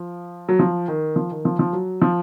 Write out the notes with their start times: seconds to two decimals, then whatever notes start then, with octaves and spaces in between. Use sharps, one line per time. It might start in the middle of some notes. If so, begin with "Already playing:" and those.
Already playing: F3
0.49 F#3
0.59 F3
0.88 D#3
1.16 F3
1.31 D#3
1.45 F3
1.59 F3
1.73 F#3
2.02 F3